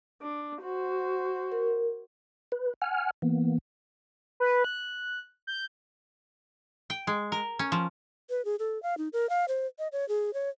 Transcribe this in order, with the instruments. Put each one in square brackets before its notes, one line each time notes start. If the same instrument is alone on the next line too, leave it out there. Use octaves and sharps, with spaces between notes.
[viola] D4
F#4 C5
[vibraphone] A#4
[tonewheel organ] B4
F#5 G#5 F6
E3 A#3 B3
[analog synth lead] B4
F#6
G6
[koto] G5
G#3
A#4
C#4
F3
[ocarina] B4
G#4
A4
F5
D#4
A#4
F5
C5
D#5
C#5
G#4
C#5